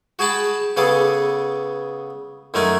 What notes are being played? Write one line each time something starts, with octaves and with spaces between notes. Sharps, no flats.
F#4 G#4 G5 A5 B5
C#3 B3 G#4 A4 D6
F#2 D#3 A3 A#4 G#5